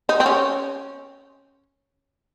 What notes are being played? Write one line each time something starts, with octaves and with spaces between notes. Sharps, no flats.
D#4
C4
C#4